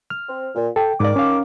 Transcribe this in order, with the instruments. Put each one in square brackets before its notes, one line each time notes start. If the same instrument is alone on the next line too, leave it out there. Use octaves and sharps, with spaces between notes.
[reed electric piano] F6
[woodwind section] C4
A#2
[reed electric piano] A4 [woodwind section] G5
[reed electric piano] G#2 D5 [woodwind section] D#3 A#4 D6
[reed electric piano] C#4 F5